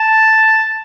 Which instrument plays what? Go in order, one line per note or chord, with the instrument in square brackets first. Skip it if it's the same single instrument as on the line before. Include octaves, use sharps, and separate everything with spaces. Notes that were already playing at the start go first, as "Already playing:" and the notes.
Already playing: [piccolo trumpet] A5